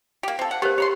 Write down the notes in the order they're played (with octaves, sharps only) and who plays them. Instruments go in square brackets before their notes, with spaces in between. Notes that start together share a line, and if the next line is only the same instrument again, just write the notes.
[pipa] A#3 G4
C4 A4
F#5
[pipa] B3 [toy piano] G4 A#4 C5
[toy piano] G4 [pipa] C#5 B5 C6